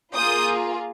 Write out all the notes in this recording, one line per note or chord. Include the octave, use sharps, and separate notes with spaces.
A#3 F4 G#4 D#6 G6